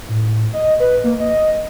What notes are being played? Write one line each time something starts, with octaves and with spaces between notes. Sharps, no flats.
A2
D#5
B4
A#3
D#5